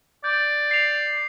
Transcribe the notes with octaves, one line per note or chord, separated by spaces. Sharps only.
D5 G6
C7 F7